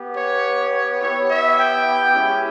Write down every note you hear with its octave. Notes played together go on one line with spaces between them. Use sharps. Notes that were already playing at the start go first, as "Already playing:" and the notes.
Already playing: B3 G4
C#5
C#5
B3 E4 G4 C#5
E5
G5
G#3 C#4 E4 G4